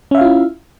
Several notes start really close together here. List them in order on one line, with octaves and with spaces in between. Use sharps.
C#4 E5 F5 F4 E4